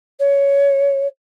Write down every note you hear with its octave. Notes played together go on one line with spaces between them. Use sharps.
C#5